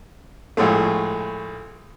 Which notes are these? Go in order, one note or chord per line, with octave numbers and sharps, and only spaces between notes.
A#1 A2 G#3 A3